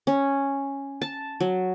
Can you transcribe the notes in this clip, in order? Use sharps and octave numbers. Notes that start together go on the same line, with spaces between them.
C#4
A5
F#3